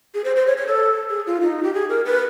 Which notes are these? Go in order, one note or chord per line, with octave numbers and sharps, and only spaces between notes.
G#4
C5
C5
C#5
C#5
A4
G#4
F4
D#4
G4
G#4
A#4
B4